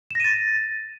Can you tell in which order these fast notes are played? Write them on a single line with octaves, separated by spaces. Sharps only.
E7 A#6 D#7 A6